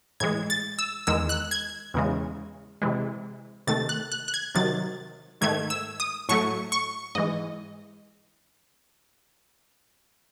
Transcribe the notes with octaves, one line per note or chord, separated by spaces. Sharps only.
A2 E3 G#3 G#6
A6
E6
E2 D#3 G#3 E6
F#6
G#6
E2 C#3 G#3
C3 E3 G#3
C3 D#3 A3 A6
F#6
F#6
F#6
G#6
C3 D#3 F#3 A6
G#2 D#3 A3 G#6
E6
D#6
A2 F#3 A3 C#6
C#6
G#2 E3 G#3 D#5